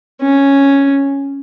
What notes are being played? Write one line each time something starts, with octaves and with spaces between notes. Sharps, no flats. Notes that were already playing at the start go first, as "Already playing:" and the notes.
C#4